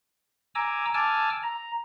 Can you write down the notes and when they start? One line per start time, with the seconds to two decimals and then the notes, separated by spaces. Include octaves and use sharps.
0.55 G#5 A#5 D6 E6
0.94 G#5 A5 D6 E6 F6
1.43 A#5